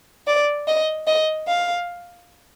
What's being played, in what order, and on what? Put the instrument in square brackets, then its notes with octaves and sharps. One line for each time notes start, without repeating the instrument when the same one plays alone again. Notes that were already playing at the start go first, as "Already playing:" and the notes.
[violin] D5
D#5
D#5
F5